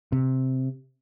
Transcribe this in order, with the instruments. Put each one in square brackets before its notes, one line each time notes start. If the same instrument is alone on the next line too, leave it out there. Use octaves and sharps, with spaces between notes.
[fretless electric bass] C3